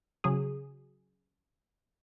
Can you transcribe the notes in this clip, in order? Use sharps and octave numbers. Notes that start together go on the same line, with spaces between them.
C#3 F#3 G#4